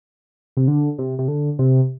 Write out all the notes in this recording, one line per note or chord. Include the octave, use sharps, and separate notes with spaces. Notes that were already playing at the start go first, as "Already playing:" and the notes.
C3
D3
C3
C3
D3
C3